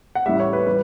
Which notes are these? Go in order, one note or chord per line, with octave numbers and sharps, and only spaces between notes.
F#5
A1 A2 G3 E5
C#5
B4
E3 G3 B4